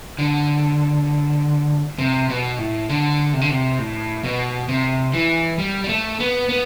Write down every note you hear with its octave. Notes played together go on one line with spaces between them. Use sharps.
D3
C3
B2
A2
D3
C3
D3
C3
A2
B2
C3
E3
G3
G3
A3
B3
B3